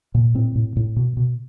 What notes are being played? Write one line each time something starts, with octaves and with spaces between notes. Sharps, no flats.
A#2
A2 C4
A2
A2
B2
B2